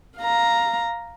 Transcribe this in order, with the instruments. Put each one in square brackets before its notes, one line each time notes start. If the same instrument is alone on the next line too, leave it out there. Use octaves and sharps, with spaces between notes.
[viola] F5 A#5